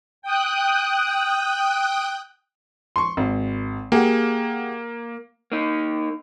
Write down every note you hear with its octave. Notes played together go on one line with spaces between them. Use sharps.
G5 D#6 F#6
C6 C#6
G#1
A#3 G4 G#4 F#5
A#3 D#4